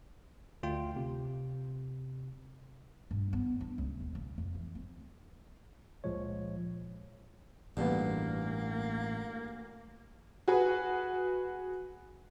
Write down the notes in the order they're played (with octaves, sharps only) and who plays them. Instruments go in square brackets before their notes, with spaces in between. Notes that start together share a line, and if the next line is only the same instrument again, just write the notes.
[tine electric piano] D2 F4 G5
C3
[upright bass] G2
B3
D4
C#2
D#2
C#3
F2
E3
C4
[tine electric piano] C#2 A#2 F3 G#3 C#5
[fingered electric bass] A1 [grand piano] D2 B3 [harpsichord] G2 A#2 [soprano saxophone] A#3
[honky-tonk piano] F#4 G#4 B4